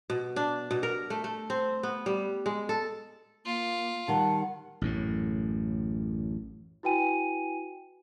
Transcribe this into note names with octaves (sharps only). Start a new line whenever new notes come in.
B2
D4
B2
A#4
A3
A3
C4
B3
G3
G#3
A4
A#3 F4
D#3 G3 F#5 A5
A1 F#2 A2
E4 F#4 B4 G5 G#5 D#7